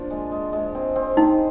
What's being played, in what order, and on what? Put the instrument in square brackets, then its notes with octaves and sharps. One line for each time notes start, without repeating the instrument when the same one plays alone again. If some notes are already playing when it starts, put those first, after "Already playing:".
Already playing: [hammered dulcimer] F3 A#3 D4 F4
G#3
G#3
G#3
C4
C4
[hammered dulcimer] D#3 [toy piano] D#4